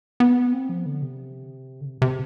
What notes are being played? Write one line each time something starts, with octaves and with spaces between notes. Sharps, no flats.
B3
C4
F3
D3
C3
D3
C3
C3